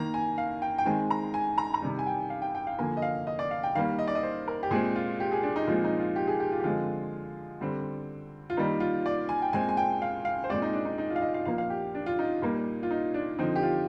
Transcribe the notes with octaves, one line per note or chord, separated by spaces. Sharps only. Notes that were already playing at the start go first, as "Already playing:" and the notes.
Already playing: D#3 A#3 A#5
G#5
F5
G5
G5
D#3 G#3 C4 G#5
A#5
G#5
A#5
A#5
C3 D#3 G3
G#5
G5
F5
G5
G5
F5
D3 F3 A#3 G#5
D#5
F5
D#5
D5
F5
G5
D#3 G3 A#3 F5
D#5
D5
D#5
C5
A#4
G4
A#2 G#3 C4 G#4
F4
G4
G#4
D4
D#4
A#2 F3 G#3 C4 F4
D#4
F4
G4
G#4
G4
F4
G4
D3 F3 G#3 C4 F4
D3 G3 C4
F4
D#3 G3 A#3 D#4
F4
D5
G#5
G5
A#2 G#3 C4 G#5
G#5
G5
F5
F5
C5
A#2 G#3 C4 D5
D#4
D4
D#4
D#4
F4
F5
D#5
F5
A#2 F3 A#3 F5
F5
G4
D4
F4
D#4
A#2 G3 A#3
F4
D#4
D4
D3 F3 C4 D#4
G4
F4